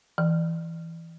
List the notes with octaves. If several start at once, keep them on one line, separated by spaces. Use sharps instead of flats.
E3